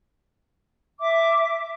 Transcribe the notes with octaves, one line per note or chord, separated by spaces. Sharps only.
E5 D6